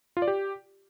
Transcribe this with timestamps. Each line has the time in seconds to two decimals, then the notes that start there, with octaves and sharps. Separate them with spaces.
0.17 F4
0.22 D5
0.28 G4